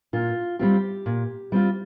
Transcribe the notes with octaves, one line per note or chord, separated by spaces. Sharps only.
A#2 F4
G3 C4 F4 G4
A#2
G3 C4 F4